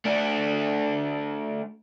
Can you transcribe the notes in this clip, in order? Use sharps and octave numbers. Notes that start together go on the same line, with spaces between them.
A3 D4